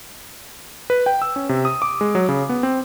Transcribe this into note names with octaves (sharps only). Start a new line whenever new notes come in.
B4
G5
E6
C#4
C3
D#6
D6
G#3
F#3
C#3
B3
C4